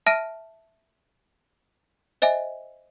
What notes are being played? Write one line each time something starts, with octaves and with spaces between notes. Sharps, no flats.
E5 A5 F6 A#6 D7 D#7
C5 D#5 E5 G#5